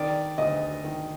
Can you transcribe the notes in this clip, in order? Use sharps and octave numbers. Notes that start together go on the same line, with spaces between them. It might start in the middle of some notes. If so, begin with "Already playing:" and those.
Already playing: D#3 D5
D2 D#5
D#3